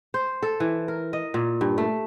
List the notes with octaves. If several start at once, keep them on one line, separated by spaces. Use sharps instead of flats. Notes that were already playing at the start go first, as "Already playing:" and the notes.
C5
A4
E3
A#4
D#5
A#2
G2
A3